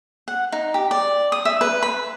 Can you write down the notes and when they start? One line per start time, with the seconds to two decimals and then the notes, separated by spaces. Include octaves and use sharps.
0.28 F#5
0.52 D#4
0.74 G4
0.91 D5
1.32 D#6
1.45 E5
1.61 B4
1.83 B5